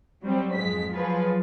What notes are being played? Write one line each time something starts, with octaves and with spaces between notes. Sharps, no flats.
F#3 G3 C4
F2 G#2 G#3 B6
F3 F#3 F4 G#4 B4